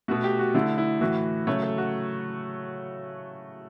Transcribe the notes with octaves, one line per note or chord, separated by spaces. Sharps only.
B2 A3 F#4
G4
F#4
D3 A3 E4
E4
A2 E3 A3 F#4
C#3 F#3 A3 C#5
A4
F#4